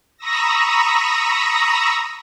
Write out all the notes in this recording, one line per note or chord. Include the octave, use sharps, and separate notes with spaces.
A#5 B5 C#6 D#6 E6 A#6